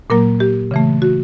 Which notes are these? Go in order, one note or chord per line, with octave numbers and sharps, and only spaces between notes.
A#2 F#3 A#3 A#4
G4
C#3 E3 A3
F#4